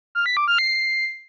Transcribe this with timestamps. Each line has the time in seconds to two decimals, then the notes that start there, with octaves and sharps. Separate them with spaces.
0.15 F6
0.26 B6
0.37 D6
0.48 F6
0.59 C7